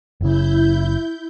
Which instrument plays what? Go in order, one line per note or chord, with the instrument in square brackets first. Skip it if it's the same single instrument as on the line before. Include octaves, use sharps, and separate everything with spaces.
[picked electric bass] F#1 C#3 [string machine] E4 G6